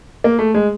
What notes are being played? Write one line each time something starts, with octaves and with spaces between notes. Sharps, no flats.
A#3
A3
G#3